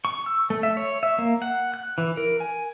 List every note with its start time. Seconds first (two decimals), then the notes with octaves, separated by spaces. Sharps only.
0.05 C#6
0.26 E6
0.50 A3
0.63 E5
0.77 C#5
1.03 E5
1.19 A#3
1.42 F#5
1.74 F#6
1.98 E3
2.17 A#4
2.40 G#5